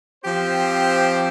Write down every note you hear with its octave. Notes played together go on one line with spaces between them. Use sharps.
F3 C4 G4 C5